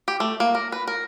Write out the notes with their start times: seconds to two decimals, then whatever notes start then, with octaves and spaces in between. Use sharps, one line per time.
0.08 G4
0.20 A3
0.40 A#3
0.55 A#4
0.72 B4
0.87 A#4